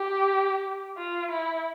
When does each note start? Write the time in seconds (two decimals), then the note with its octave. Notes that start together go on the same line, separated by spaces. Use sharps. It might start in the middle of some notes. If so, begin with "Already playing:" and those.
Already playing: G4
0.98 F4
1.31 E4